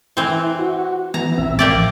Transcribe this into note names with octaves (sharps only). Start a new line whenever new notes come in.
E3 C4 E4
F#4
E3 B3 A#5
A1 A#2 C4 E5
A1 F3 A#3 G4 D5 A6